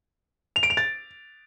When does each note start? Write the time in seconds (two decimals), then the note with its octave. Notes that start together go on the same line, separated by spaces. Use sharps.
0.56 F7
0.63 D7
0.70 F7
0.77 A6